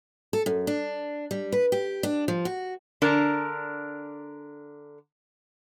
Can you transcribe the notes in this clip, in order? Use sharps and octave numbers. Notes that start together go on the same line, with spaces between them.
A4
F#2
D4
G3
B4
G4
D4
F3
F#4
D3 D4 A#4